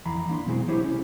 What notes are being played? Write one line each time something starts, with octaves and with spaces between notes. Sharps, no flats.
F2 E3 A#5 B5
A#3 D4 C6
B2 E3 F#3 G#3 C4 G#4
E4 G4 G#4 C5 C#5
C2 C#4